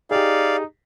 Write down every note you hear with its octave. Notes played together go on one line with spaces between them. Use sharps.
D#4 G4 G#4 D5 F5